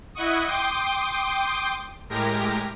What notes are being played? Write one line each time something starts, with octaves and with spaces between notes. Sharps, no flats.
E4 D#5 F#5 C#6 D#6
G5 C6 D6 D#6 G6
A2 G#3 G4 A#4 A#6